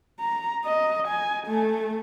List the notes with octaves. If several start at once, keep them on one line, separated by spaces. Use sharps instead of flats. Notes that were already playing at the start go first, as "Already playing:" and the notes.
A#5
D#5
G#5
A3